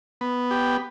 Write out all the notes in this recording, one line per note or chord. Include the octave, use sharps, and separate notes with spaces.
B3
G4